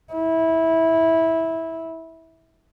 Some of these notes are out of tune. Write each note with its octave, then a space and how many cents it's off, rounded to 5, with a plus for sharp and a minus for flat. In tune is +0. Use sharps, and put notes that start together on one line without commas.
E4 -15